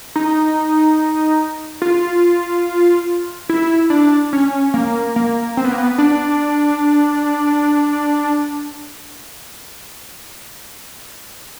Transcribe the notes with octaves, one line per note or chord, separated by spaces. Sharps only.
D#4
F4
E4
D4
C#4
A#3
A#3
C4
B3
A#3
B3
D4